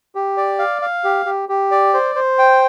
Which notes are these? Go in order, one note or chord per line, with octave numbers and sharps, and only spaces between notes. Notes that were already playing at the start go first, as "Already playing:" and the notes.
G4
D5
F5
F5
G4
G4
G4
D5
C5
C5
G5